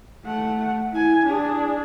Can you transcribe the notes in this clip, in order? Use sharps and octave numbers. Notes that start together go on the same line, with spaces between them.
A3 F#5
E4 G#5
D4 G#4